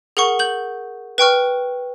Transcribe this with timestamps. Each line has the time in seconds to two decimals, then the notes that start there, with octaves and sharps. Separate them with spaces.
0.17 G#4 A#4 F#5 C#6
0.39 G6 F#7
1.18 B4 G5 C#6 F6